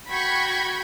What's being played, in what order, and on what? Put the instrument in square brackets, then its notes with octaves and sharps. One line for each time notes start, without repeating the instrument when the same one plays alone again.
[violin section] F#4 G5 B5 C#6 G#6 B6